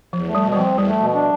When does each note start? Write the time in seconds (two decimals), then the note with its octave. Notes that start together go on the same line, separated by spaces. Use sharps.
0.13 E2 F3
0.27 A3
0.35 G3
0.43 B2
0.53 G3
0.57 F3 C4
0.71 E2
0.78 G3
0.86 A3
1.00 B2
1.14 D4